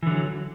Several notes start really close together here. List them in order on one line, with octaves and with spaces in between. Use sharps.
E3 D3 F#3